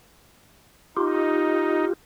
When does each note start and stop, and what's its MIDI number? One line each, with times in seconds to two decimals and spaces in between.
0.97 1.85 63
0.97 1.93 65
0.97 1.93 67